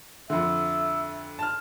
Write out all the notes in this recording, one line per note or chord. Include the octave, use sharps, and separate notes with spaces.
F2 D3 E5
A5 F6